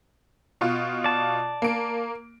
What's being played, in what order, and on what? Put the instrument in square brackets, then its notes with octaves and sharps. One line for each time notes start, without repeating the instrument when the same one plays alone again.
[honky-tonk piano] B2 F4
[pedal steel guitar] D5 A5
[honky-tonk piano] A#3 D7